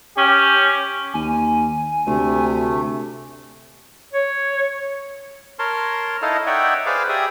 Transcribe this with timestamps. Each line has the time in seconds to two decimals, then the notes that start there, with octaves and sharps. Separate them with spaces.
0.17 C#4 G4
1.14 D#2 G#5
2.07 D2 C3 A3
4.13 C#5
5.59 A#4 C#5 A5 C6
6.22 D#4 E4 A4 D#5 F5
6.47 D#4 C#5 D5 E5 F#5 G5
6.86 G#4 B4 C5 D5 F5 D6
7.09 G4 G#4 D5 E5 D#6